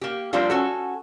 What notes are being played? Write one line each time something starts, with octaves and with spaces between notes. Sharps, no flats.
A#3 G4
F3 G3 A#3 C4 D4 F4
C#4 F#4 A4